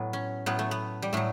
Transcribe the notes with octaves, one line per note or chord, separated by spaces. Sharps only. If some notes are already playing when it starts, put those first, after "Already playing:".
Already playing: A2 F#3 B3
C#4
A2 F#3 B3
A3
B3
G3
A2 F#3 A3